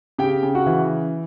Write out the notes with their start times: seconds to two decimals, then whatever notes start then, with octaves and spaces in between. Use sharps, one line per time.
0.19 C#3 G4 G5
0.43 C#3
0.55 F#4 F#5
0.66 E3